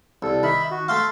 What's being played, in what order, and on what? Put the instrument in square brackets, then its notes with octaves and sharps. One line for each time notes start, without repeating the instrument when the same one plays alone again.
[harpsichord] C2 [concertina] A4
[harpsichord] D#3 [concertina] E5 B5
[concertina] F#4
[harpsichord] A3 E5 F5 [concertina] C6